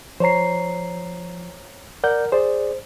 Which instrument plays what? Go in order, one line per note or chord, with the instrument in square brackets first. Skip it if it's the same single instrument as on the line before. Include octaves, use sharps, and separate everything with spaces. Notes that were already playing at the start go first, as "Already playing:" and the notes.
[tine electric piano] F3 C7 [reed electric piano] C5 C#5 A#5
[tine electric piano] A#4 [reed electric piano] D5 F#5 G6
[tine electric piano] G#4 D5 [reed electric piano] C5